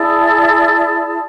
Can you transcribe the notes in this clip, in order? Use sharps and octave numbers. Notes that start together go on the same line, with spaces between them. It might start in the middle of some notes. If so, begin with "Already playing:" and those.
Already playing: E4 G#4 D5 A5